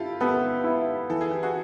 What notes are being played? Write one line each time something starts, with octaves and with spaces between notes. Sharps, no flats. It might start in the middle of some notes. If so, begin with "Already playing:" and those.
Already playing: E4 F4 G4 A4
B3 G4 A4
E4
E3 A4
G#4
G4
F#4 G#4